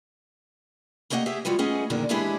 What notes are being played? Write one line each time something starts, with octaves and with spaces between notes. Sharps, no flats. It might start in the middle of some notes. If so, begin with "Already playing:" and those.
A3 A#3 G4 D#5 F5 F#5
G4 G#4 E5
E3 G3 G#3 F4 F#4
A3 B3 C#4 G#4 D#5 F#5
F2 A#2 D3 D#3 D4 A#4
E3 G#3 D4 E4 G4 G#4